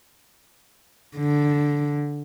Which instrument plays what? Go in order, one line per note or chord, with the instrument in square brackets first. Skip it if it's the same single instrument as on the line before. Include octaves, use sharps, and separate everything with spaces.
[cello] D3